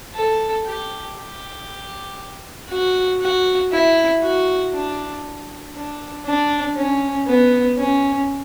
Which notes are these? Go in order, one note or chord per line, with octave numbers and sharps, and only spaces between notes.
A4
G4
G4
F#4
F#4
E4
F#4
D4
D4
D4
C#4
B3
C#4